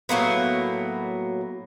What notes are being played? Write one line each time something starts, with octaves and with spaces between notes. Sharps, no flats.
A2 F#3 A#3 B3